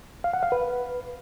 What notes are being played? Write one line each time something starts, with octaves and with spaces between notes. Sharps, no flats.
F5
F#5
F5
B4